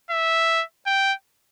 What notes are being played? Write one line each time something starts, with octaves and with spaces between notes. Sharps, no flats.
E5
G5